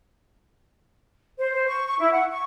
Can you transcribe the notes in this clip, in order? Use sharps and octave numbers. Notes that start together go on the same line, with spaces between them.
C5
C5
C#6
C#6
E4
F#5
C#6